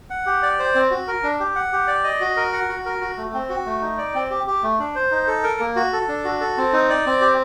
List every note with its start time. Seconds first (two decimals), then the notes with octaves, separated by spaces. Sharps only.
0.10 F#5
0.26 G4
0.43 D5
0.59 C5
0.75 C4
0.91 F#4
1.07 A#4
1.23 D4
1.40 G4
1.56 F#5
1.72 G4
1.88 D5
2.04 D#5
2.20 F#4
2.37 A#4
2.53 F#5
2.69 F#4
2.86 A#4
3.01 F#4
3.17 A3
3.34 C4
3.49 F#4
3.66 A3
3.81 D#4
3.98 D5
4.14 C4
4.30 G4
4.47 G4
4.63 A3
4.79 D4
4.95 C5
5.11 D#4
5.27 A4
5.43 A#4
5.60 A#3
5.76 F#4
5.93 A4
6.08 D4
6.24 F#4
6.41 A4
6.57 C4
6.73 D#4
6.89 D5
7.06 C4
7.21 G4